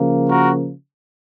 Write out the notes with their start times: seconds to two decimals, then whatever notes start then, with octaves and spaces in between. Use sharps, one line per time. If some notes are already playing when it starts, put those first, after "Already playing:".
Already playing: C#3 F3 A#3
0.30 F#4 A#4